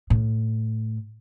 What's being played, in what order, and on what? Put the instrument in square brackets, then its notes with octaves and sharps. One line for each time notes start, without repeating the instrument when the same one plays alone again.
[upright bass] A2